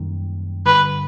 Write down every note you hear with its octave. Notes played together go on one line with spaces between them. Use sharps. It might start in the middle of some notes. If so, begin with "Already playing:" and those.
Already playing: F#2 D#3 G3 A#3
G2 D3 G3 B4